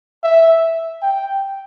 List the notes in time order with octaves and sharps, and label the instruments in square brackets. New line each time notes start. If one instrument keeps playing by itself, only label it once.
[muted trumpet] E5
G5